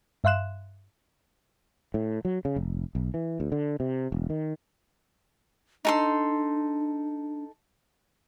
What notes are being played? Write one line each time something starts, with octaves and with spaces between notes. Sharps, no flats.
G2 E5 F5 C6 F#6 E7
A2
F#3
C#3
F1
B1
E3
D2
D3
C3
E1
D#3
D4 D#4 A4 C6